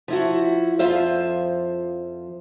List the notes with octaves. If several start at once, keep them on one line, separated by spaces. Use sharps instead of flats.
F3 E4 F#4
F2 F3 F4 C5 E5